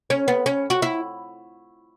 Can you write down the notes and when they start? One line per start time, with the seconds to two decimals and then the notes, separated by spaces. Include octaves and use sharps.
0.10 C#4
0.28 B3
0.46 C#4
0.70 F#4
0.82 E4